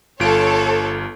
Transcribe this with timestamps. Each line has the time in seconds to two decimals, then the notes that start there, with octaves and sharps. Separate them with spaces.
0.20 G1 F4 A4 C#5 D7